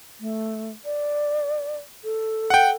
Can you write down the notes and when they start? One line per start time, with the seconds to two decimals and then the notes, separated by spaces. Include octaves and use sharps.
0.20 A3
0.85 D5
2.04 A4
2.50 F#5 G5